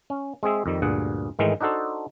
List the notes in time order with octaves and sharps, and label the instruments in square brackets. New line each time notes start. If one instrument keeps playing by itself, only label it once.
[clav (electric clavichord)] C#4
G#3 C4 G#4 E5
F2 D#3 G3
D2 G2 A#2 G#4 F#5
G#2 D#3 E3 G#3 A3
D4 D#4 F#4 A4 C5